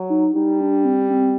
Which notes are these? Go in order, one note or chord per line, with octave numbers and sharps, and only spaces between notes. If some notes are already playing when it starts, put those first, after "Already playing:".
Already playing: F#3
D#4
G3 D#4
D4
C4
C4